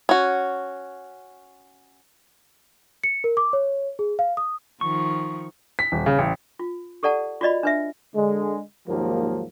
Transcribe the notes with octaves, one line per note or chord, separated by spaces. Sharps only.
C#4 F#4
C#7
A#4
D6
C#5
G#4
F5
D#6
D#3 F3 C#6
B6
D#1
C#3
A1
F4
G4 A4 D5 F#5 A5
F4 F#4 D5 D#5 B5
D4 B4 E5
D3 G#3
D#2 G#2 F3 F#3 A#3